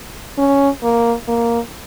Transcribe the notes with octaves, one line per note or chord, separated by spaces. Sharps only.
C#4
A#3
A#3